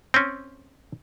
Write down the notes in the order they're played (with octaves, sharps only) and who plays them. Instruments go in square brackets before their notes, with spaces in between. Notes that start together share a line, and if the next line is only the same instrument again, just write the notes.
[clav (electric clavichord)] C4 C#4